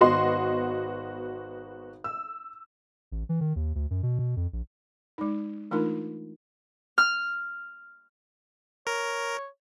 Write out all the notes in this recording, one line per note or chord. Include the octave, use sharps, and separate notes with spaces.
G#1 B3 F#4 D#5 C6
E6
A1
E3
D#3
D#2
D2
F#2
B2
B2
F2
A#1
G#3 D#4
E3 A3 D4 D#4 F4 A#4
F6
A#4 C#5